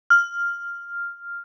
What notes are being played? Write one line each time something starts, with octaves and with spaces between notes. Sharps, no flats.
F6